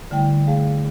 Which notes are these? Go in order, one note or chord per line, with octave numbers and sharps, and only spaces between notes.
D3 G3 A3 E4 G5
A3 G#4 F5